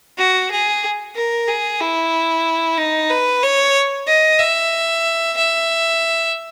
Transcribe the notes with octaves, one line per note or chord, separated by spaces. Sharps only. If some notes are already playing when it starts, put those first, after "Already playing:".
F#4
G#4
A#4
G#4
E4
D#4
B4
C#5
D#5
E5
E5